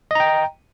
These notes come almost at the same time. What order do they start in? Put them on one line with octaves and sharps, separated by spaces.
D#5 A#5 G5